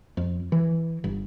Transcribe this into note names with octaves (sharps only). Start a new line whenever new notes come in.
F2
E3
G1